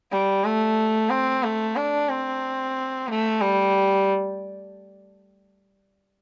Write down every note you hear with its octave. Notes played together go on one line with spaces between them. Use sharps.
G3
A3
C4
A3
D4
C4
A3
G3